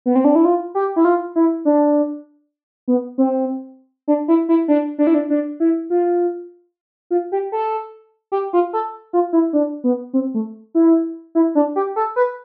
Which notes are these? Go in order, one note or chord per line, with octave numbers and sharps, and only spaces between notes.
B3
C4
D4
E4
F4
G4
E4
F4
E4
D4
B3
C4
D4
E4
E4
D4
D4
E4
D4
D4
E4
F4
F4
G4
A4
G4
F4
A4
F4
E4
D4
B3
C4
A3
E4
E4
D4
G4
A4
B4